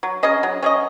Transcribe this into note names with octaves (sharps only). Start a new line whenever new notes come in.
F#3
C#4 G#4 D#5
F#3
C#4 G#4 D#5